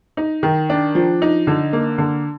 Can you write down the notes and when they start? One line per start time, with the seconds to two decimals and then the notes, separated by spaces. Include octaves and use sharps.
0.17 D#4
0.43 D#3
0.70 D4
0.95 F3
1.22 D#4
1.47 D3
1.73 A#3
1.98 D3